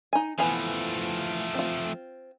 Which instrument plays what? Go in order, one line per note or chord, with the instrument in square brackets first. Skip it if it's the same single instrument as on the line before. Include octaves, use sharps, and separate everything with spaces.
[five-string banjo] D#4 G#5
[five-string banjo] E3 B3 G#5 [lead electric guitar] F3 A3
[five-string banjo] C4 F4